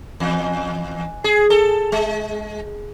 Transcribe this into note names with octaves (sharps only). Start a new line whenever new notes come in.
E2
G#4
A4
G#3